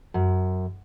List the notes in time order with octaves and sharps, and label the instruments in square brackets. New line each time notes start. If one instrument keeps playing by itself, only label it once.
[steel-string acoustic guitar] F#2